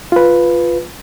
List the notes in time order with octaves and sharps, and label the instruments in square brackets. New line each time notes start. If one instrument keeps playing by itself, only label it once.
[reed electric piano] F4 B4